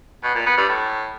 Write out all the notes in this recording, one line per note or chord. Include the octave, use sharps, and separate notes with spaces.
B2
A#2
B3
G2
A2